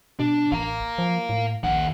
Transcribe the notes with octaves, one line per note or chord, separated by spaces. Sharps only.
B2 D4
A1 F5 A#5
F3
A2
A#1 D#2 F#5